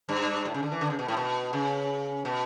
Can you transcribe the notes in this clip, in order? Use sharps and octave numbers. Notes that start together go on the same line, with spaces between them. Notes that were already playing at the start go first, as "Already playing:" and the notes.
G2
A2
C#3
D3
E3
D3
C#3
B2
A2
B2
C#3
B2